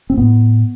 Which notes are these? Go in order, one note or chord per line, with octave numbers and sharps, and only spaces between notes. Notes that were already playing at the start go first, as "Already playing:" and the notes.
C4
A2 B3